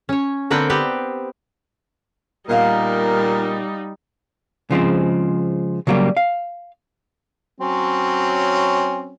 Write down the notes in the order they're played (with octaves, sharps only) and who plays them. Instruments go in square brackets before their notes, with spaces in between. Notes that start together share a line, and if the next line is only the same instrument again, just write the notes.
[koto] C#4 C#5
D3 A#3 C4 B4 F#5 G5
B3 C4 G4 B4
[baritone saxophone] A#2 [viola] G3 D#4 [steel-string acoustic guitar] B3 D#5 F5 [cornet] A#4
[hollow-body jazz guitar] C#3 F3 G#3 C4
C#3 F#3 G3 A3 A#3
F5
[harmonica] F#3 C4 C#4